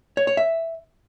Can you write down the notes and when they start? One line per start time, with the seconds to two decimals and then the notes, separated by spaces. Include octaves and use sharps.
0.17 C#5
0.27 C#5
0.37 E5